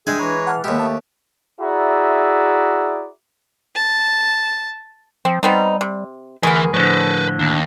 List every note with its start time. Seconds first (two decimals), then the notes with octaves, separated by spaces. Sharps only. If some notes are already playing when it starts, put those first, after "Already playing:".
0.07 G#3 D4 G#4 E5 G5 G#5
0.19 E3 B4 C#5 A#5
0.47 F#5 A5 F6
0.64 D#2 G#3 B3 G4 E5
0.79 A3 A5
1.60 E4 F#4 G#4 D5 E5 A#5
3.75 A5
5.25 F3 C4
5.43 G3 B3 C4 D#4
5.81 C3
6.43 D2 E3 B3 G#4 A#4 B4
6.74 A2 D3 F3 B4 C5
7.39 D#2 D4